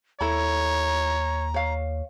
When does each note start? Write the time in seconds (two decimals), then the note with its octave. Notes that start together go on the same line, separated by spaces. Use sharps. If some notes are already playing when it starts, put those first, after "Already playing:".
0.21 D#2 E4 A4 C#5 A#5 B5
1.54 C#5 F5